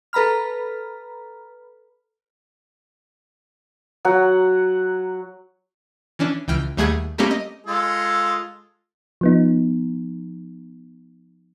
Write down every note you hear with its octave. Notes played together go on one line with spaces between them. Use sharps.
A4 B4 A#5 B5 F6
F#3 F#5
E3 C#4 D4
C#2 E3 G5 F6
D#2 G3 A3 G#4 F#5 G#6
G3 A3 A#3 C4 C#4 G4
D#5
G#3 F4 A4
F3 B3 D#4